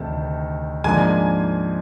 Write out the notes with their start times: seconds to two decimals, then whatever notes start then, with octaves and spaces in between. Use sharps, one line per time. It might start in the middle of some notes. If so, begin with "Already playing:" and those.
Already playing: D2 C3 D#3 A5
0.84 G#2 F3 A#3 D4 G#5